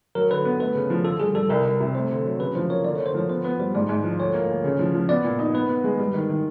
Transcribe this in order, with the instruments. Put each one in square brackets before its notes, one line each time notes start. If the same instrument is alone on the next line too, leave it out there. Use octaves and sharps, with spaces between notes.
[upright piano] F#3 [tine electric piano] A#4
[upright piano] D3 [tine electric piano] B4
[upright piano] B3
[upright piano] A3 [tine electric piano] B4
[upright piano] C#3
F3
[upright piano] D3 [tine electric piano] A4
[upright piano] G3 [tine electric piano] G#4
[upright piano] G3 [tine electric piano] A4
[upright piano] C2 [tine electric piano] A#4
[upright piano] C2
C3
[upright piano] A3 [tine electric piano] C5
[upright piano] D3
F#3
[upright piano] C#3 [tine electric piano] B4
[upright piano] F3 [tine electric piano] C5
[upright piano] A#3 [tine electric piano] C#5
[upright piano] D3 [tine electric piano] D5
[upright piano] D3 [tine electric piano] C#5
[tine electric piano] C5
[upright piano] F3 [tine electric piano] C#5
[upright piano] B3 [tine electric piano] C5
[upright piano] B3 [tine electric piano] B4
[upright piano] G3 [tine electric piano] C5
[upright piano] G#2 [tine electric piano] D5
[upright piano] G#2
F3
[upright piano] D2 [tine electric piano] C#5
[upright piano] A#3
D2
C#3
F3
F3
[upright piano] B3 [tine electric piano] D5
[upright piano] A#2
D#4
[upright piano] B3 [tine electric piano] B4
[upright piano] B3
G#3
G3
D#3
D#3